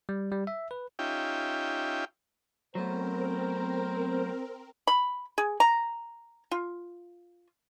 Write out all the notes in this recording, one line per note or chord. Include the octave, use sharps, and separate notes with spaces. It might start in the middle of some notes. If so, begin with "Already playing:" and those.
G3
G3
E5
B4
C#4 D#4 F4 G4 E5 G5
F#3 A3 B3 C4 A#4 C5 A#5
B5
G#4
A#5
F4